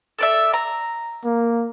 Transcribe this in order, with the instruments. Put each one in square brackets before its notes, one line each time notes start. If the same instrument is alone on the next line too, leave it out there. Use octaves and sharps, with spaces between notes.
[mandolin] A4 D5 E5
A#5
[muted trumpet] A#3